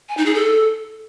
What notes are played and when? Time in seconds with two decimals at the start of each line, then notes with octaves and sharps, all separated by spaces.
0.09 G#5
0.17 D#4
0.26 G#4
0.34 A4